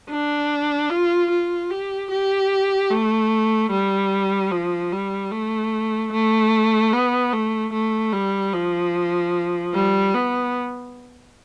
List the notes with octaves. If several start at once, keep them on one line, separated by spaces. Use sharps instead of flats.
D4
F4
F4
G4
G4
A3
G3
F3
G3
A3
A3
B3
A3
A3
G3
F3
G3
B3